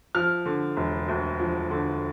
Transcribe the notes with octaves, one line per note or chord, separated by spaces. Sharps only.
F3 F6
D3
E1
D2
F3
D3